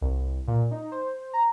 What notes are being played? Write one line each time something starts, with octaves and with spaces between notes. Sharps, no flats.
C2
A#2
D#4
C5
A#5